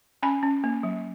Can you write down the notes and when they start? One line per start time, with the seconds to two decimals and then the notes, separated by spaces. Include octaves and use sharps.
0.23 C#4 G#5 B5
0.43 C#4
0.64 A#3
0.83 F#3